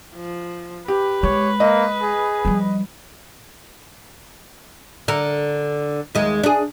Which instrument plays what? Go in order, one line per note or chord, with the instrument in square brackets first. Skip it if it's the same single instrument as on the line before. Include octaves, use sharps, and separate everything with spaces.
[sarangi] F3
[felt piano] G4 [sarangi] B4
[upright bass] G#3 [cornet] C#5
[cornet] A#3 [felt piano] D#5
[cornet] G#4
[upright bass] F3 G3
[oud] D3 A#4
D#2 G#3
D4 G#4